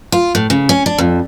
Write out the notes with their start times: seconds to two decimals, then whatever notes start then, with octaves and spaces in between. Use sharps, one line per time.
0.12 F4
0.35 A2
0.50 C#3
0.69 C#4
0.86 D4
0.98 F2